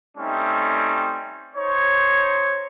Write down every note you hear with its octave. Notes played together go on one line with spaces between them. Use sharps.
G3 A3 C4 C#4 D#4
D#4 C5 C#5